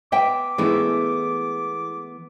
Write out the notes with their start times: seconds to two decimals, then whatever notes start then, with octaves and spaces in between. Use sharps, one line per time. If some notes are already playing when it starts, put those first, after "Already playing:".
0.12 B3 E5 G5 D6
0.58 E3 G#3 A3 B3 E4